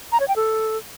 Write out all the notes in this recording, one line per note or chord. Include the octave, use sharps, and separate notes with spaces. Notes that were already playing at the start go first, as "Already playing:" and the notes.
A#5
C#5
G5
A4